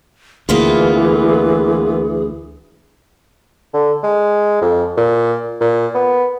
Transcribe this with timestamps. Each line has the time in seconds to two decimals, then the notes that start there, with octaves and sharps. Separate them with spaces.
0.49 D2 E3 A#3 B3 F4 G#4
3.74 D3
4.03 G#3
4.61 F2
4.97 A#2
5.61 A#2
5.95 B3